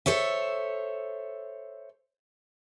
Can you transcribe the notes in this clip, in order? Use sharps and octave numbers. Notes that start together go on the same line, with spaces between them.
A4 C5 C#5 E5